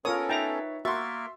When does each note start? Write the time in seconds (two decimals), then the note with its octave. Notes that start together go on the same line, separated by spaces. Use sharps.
0.05 B3 C#4 F4 A4 A#4 C#5 D#6
0.29 D#4 B4 E5 G5 A#5
0.85 A#3 F#4 A#4 E5 C6 C#6 A6